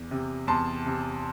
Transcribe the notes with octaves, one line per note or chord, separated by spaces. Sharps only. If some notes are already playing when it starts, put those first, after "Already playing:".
Already playing: E2
C3
E2 A5 C6
C3